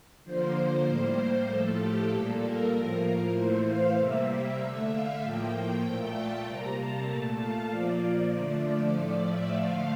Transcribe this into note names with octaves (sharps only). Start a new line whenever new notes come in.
D3 F3 A#3 C5
A2 G3 A#3
A2 F3 A3 A4
G4
A#2 G3 A#3 A4
A#4
A2 F3 A#3
A2 E3 A3 C5
F5
C3 G3 A#3 E5
D3 A3
F5
A2 F3 A#3 G5
A#2 A3
A5
C3 G3 A#3 A#5
A5
A3
A#2
F5
A#2 F3 A#3 D5
D5
D3 F3 A3
A2 F3 A3
E5
D3 F3 A3 F5